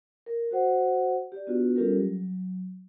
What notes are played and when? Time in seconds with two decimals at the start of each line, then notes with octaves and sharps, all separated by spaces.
0.26 A#4
0.51 F#4 C5 F#5
1.32 G4 D5
1.47 B3 D4 F4 F#4 B4
1.76 G3 C#4 F4 G4 A4 A#4
1.98 F#3